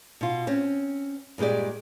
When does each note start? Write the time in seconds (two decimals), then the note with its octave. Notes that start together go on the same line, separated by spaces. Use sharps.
0.21 B2 F4
0.47 C4 C#4
1.38 G2 A#2 G#3 G4 D5